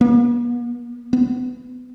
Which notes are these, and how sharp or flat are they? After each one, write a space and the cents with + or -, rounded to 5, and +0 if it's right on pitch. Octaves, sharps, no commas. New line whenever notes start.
B3 -45
B3 +20